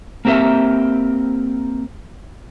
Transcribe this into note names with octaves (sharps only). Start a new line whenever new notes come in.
A#3 C4 G4 A#4 E5